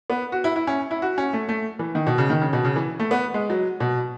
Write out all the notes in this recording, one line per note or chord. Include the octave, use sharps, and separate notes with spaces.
B3
F#4
E4
E4
C#4
E4
F#4
C#4
A3
A3
E3
D#3
B2
C#3
D#3
C#3
B2
C#3
E3
A3
B3
G#3
F#3
B2